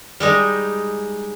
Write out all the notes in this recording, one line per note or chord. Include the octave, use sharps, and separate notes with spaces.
G3 G#3 D#4